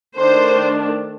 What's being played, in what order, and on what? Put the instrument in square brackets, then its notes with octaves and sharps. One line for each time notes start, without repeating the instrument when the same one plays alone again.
[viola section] D#3 A3 D4 C5